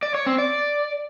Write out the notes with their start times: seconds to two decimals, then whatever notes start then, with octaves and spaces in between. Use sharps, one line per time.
0.03 D5
0.15 C#5
0.26 C4
0.38 D5